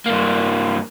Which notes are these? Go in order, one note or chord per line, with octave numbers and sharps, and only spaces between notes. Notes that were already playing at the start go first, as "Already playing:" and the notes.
G2 A#3